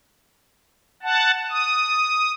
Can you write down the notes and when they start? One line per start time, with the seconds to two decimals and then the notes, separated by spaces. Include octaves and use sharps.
1.03 F#5 A5
1.50 D#6